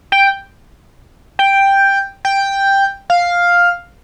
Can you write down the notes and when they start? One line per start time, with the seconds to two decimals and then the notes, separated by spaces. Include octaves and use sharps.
0.12 G5
1.39 G5
2.25 G5
3.10 F5